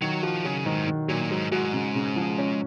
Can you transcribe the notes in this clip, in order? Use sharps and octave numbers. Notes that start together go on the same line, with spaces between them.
D#3 F#3
F3 F#4
C#3 F#3
G#2 D#3
D#3
A#2 F#3
G#2 F#3
G#2 F#4
C#3
C#3
F3
C#4